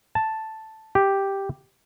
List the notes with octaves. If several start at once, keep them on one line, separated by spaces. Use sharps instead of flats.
A5
G4